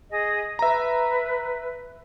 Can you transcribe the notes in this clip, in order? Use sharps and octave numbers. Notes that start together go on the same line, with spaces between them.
G#4 D#5
B4 E5 A#5